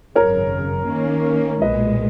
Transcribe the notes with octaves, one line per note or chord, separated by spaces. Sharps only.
G#1 F#2 C#3 A#4 C#5
D#3 A#3 C#4
B1 A#2 G#3 B4 D#5